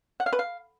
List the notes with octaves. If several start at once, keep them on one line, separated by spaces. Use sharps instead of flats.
F#5
F5
B4
F5